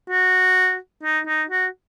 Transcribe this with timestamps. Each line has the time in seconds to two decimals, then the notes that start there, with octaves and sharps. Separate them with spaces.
0.10 F#4
1.03 D#4
1.27 D#4
1.50 F#4